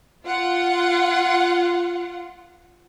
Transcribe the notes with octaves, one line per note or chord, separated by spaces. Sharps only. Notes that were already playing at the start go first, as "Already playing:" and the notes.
F4 F#5